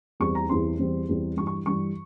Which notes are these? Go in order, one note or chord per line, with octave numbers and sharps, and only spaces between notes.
E2 E3 G3 C4 C#6
A#5
E2 E3 G3 C4 C6
E2 E3 G3 C4
E2 E3 G3 C4
G2 E3 G3 C#6
C#6
G2 E3 G3 C#6